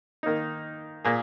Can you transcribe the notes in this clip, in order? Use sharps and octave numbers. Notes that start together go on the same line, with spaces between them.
D#3 A#3 D#4
A#2 A#3 G#4